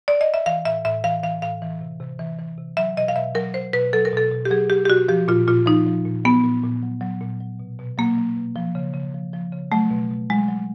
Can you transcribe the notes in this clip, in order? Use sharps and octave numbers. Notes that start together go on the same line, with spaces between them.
D5
D#5
E5
E3 F5
A2 E5
A2 E5
E3 F5
E3 F5
A2 F5
E3
C3
C3
E3
E3
C3
F#3 E5
B2 D#5
F5
B2 E5
F#3 A#4
F#3 C5
B2 B4
F#3 A4
A#4
B2 A4
B2
G4
F#3 G#4
F#3 G4
G4
B2 F#4
F3 G4
A#2 F4
A#2 F4
F3 D#4
F3
A#2
F#3 B3
A#2
A#2
F#3
F#3
A#2
F#3
B2
B2
F#3 A#3
F#3
B2
F3
C#3
C#3
F3
F3
C#3
F#3 A3
B2
B2
F#3 G#3
F#3